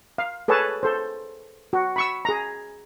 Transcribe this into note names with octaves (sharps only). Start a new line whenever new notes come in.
F5
G#4 A4 B4 C#5 A5
A4 C5
F#4
B5 C#6 E6
G#4 A#5